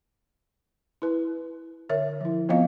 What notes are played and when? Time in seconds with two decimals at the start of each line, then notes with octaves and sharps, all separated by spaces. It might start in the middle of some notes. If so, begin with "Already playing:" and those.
1.02 E4 B4
1.89 D3 A#4 C#5 E5
2.21 F3 E4
2.49 F3 B3 C4 F4 D#5 F5